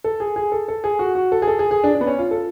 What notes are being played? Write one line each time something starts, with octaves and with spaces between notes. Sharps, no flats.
A4
G#4
G#4
A4
A4
G#4
F#4
F#4
A4
G#4
A4
G#4
G#4
D4
D4
B3
C#4
F4
A4